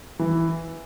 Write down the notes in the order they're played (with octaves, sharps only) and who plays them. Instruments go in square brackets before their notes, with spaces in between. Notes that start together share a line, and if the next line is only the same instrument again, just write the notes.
[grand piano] E3